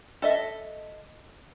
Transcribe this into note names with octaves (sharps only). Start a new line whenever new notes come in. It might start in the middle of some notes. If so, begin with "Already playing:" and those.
A4 D#5 E5